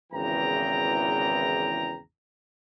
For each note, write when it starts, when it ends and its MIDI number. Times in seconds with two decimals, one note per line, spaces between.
0.12 1.99 32
0.12 1.99 40
0.12 1.99 49
0.12 1.99 52
0.12 1.99 79
0.12 1.99 82